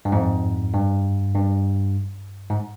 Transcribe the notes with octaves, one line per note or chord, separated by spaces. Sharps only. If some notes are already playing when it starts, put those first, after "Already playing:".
G2
F2 G#2
G2
G2
G#2